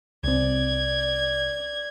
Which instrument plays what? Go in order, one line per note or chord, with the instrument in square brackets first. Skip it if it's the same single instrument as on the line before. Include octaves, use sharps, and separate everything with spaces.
[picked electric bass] C2 C4 [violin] D5 G#6